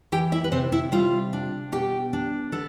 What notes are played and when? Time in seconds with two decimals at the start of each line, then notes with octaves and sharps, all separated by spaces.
0.12 E3 G4 G5
0.32 E4 E5
0.44 B4
0.52 C3 C4 C5
0.72 E4 E5
0.92 G3 F4 F5
1.33 D4
1.72 B2 G4 G5
2.13 D4
2.52 B3 A4